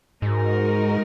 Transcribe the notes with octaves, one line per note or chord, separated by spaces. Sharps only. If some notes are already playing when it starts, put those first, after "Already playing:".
G#2 G#3 D#4 F#4 A#4